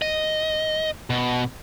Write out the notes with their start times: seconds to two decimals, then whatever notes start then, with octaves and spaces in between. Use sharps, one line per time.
0.02 D#5
1.10 B2